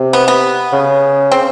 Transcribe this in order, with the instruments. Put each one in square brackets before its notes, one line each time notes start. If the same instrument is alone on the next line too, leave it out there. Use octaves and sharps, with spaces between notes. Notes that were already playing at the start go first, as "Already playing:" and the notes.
Already playing: [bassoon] C3
[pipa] B3
B3
[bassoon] C#3
[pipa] C4